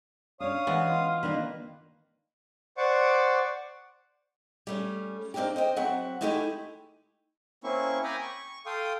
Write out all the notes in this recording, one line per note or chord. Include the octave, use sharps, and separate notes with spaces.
C#4 D4 C#5 F5 D#6
E3 G#3 B3
F4
D#3 A#3 D4 D#4 B4
C5 D5 F#5 C#6 D6
G3 A3 C#4
A#3 C4 D4 D#4 G4
C5 D#5 G5
F#3 C4 E5 F#5
G#3 A3 D#4 E4 F#4 G4
A#3 C4 C#4 E4 C#6
G5 G#5 A#5 B5 D6 D#6
C#6
A4 F5 G5 C6 D#6